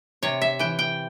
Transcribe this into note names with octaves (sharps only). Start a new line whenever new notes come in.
C3 C#5
E5
E3 G5
G5